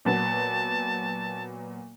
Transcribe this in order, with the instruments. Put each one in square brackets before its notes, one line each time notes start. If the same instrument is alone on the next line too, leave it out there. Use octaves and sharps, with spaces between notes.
[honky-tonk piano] A#2 F#3 B3 [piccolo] A5